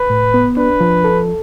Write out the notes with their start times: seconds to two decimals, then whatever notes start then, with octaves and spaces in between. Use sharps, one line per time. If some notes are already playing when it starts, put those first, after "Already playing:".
Already playing: B4
0.10 A2
0.34 B3
0.57 D4 B4
0.81 F3
1.04 A4